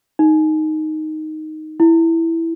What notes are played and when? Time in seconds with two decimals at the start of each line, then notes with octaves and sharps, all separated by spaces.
0.19 D#4
1.80 E4